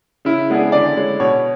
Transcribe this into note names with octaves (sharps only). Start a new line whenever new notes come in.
C#3 E4
G#3 B3 D4 G#4
D3 D5
G#3 C#4
B2 C#5